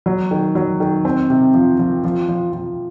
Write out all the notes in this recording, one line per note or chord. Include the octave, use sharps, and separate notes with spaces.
F#3
D#3
F#3
D#3
C4
C3
F3
F3
F3
F3
F3